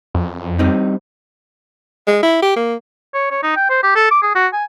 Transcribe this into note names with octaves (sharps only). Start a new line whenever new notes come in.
F2
G3 C4 D#4
G#3
E4
G4
A#3
C#5
C#5
D#4
G5
C5
G4
A4
D6
G#4
F#4
G#5